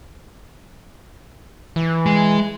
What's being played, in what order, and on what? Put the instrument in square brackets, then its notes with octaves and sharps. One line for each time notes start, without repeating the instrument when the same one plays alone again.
[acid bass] E3
[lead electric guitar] G#3